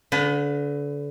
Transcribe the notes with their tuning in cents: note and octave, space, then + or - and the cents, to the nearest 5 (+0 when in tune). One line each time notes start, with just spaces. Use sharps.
D3 -30 B4 +25